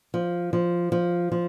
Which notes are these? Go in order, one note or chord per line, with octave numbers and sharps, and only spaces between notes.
F3
F3
F3
F3